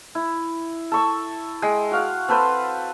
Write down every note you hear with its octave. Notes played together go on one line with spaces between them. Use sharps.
E4
A4 C#6 E6
G#3 G5
F#4 F5 F#5
C4 A4 B4 C5